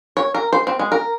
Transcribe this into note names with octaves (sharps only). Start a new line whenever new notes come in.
C#5
A#4
C5
C4
G#3
A#4